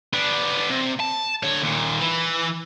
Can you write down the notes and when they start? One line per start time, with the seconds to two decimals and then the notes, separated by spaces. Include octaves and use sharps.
0.13 B3 D4
0.70 C3
1.00 A5
1.43 D3 C#5
1.63 D#2 A#2
2.00 E3